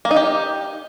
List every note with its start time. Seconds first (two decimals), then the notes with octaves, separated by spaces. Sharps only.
0.05 A#3
0.11 D#4
0.16 G4